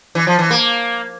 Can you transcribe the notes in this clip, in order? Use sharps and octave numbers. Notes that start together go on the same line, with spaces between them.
E3
F3
E3
A#3